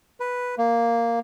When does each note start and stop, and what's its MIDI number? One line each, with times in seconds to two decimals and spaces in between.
0.20 0.55 71
0.58 1.19 58